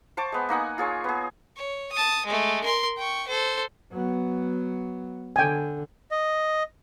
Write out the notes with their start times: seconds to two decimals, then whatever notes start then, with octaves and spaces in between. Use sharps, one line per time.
0.17 C5 A5 C#6 D6
0.32 G#3 B3
0.49 A#3 D#4 F#5 G#5
0.78 F4 G#4 C#5
1.04 B3 G#4
1.56 C#5
1.92 A5 D#6
2.26 G#3 A3
2.64 A#4 C6
2.97 G5 C#6
3.28 A4 C5
3.93 F#3 B3
5.36 D3 G5 G#5
6.11 D#5